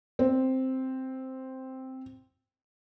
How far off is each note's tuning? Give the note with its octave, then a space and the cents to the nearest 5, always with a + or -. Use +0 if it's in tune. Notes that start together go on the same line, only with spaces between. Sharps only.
C4 +0